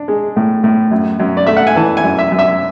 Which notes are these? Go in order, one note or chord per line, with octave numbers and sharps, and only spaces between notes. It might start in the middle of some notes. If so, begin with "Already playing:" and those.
Already playing: D4
G#3
A2
A2
F#2
F#2
D5
A3 E5
F#5
G#5
E3 A5
G#5
F#2
E5
F#2
E5